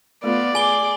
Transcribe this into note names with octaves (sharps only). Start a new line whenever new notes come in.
A3 B3 F4 A4 D5
G#4 G#5 D6 G7